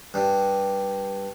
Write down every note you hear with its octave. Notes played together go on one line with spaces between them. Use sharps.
G2